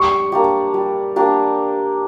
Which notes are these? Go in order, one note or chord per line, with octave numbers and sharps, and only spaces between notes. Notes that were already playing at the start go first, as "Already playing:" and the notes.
Already playing: G3 C#6
A#3 D4 G4
G3
A#3 D4 G4